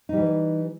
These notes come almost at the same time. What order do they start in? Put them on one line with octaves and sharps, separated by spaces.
D#4 G3 E3